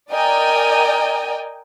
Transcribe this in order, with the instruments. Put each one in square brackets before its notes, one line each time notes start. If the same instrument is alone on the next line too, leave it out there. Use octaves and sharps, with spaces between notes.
[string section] A#4 D5 D#5 G5 G#5